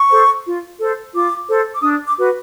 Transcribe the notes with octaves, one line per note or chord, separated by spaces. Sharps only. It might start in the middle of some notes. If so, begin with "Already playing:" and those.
Already playing: C#6
A4 C5
F4
A4 C5
F4 D6
A4 C5
D6
D4 D#6
D6
F#4 B4